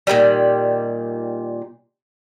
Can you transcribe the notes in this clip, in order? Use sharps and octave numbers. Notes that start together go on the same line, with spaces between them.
A#2 D3 D#3 G3